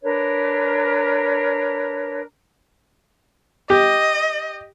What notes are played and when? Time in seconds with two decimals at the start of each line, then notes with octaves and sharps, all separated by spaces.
0.01 D4 A#4 B4 C#5
3.70 G4 D#5